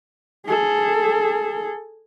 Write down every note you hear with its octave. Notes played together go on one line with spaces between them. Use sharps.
G#4 A4